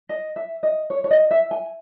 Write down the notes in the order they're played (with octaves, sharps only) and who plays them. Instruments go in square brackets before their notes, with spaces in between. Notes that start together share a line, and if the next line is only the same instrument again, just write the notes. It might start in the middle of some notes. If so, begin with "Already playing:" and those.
[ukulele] D#5
E5
D#5
C#5
C#5
D#5
E5
G#5